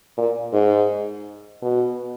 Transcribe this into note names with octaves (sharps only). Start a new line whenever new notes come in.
A#2
G#2
B2